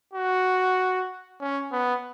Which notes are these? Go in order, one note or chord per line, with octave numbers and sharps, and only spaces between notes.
F#4
C#4
B3